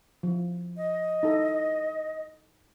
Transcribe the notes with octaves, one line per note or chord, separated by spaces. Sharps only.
F3 E4
D#5
D#4 E4 A4